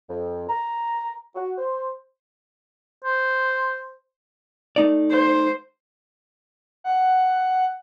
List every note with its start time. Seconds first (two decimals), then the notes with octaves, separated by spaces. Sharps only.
0.09 F2
0.49 A#5
1.35 F#4
1.58 C5
3.05 C5
4.76 A3 D#4 D5
5.10 C5
6.84 F#5